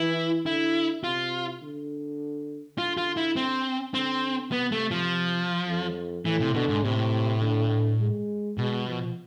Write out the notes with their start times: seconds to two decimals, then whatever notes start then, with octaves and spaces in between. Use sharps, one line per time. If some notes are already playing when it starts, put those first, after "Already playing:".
Already playing: E3 E4
0.46 D3 E4
1.04 C3 F4
1.62 D3
2.78 D3 F4
2.97 F4
3.17 E4
3.36 C4
3.93 D3 C4
4.52 C3 B3
4.72 A3
4.91 F3
5.68 F2
6.25 A2 E3
6.40 C3
6.54 B2 D3
6.69 G#2
6.84 A2 C3
7.41 D3
8.00 G#3
8.58 B2 G#3
8.87 F3